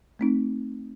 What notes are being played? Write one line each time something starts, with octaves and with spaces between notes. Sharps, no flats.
A3 C4 D#4